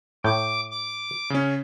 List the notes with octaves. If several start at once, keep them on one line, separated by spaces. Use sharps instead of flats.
A2 G5 D6
D6
C#3 C#4